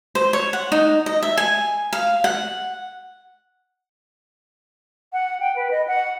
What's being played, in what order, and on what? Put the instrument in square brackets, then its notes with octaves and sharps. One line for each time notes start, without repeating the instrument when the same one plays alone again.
[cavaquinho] C5
C#5
F#5
D#4
D#5
E5
G#5
F5
F#5
[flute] F#5
G5
B4
D#5
F#5